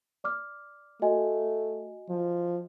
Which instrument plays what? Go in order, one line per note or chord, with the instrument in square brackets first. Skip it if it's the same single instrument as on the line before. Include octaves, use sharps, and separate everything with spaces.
[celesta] D5 D6 F6
[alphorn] A3 [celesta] F#4 D#5 G#5
[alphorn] F3